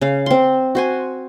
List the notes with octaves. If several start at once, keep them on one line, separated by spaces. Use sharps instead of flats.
C#3 F5
C4 C6
F#4 C5 G#5